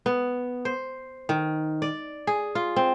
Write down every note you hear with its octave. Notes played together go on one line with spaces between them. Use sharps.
B3
C5
D#3
D5
G#4
F4
C4